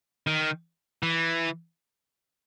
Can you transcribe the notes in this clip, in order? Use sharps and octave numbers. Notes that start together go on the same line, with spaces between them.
D#3
E3